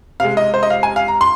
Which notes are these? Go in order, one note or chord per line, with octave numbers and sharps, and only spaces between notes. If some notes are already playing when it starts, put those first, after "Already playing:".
C3 G#3 F5
D#5
C5
D#5
F5
G#5
F5
A#5
C6